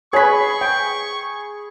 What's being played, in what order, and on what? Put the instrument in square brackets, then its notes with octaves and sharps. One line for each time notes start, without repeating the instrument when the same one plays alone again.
[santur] G#4 B5 [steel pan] B4 C#5 [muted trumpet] C#6
[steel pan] G5